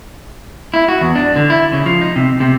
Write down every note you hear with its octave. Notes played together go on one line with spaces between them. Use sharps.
E4
F#4
E2
D4
D3
E4
C#3
F3
D#4
C3
C3